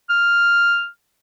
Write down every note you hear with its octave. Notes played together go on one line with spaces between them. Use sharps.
F6